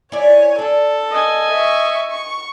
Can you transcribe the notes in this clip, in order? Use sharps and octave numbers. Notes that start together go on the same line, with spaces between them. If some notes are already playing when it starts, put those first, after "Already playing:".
E4 C#5 D5 G#5
D4 A4
D#5 G#5
E5 C#6
C#6